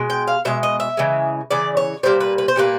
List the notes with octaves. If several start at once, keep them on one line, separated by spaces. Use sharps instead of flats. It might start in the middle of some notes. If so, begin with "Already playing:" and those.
Already playing: B2 G#3
G5
F5
B2 G#3 E5
D#5
E5
C#3 E3 G#3
C#3 E3 D5
C#5
A#2 G3 A#3 C5
B4
B4
C5
A#2 G3 A#3 B4